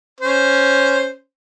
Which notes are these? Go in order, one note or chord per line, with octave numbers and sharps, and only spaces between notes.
C#4 C5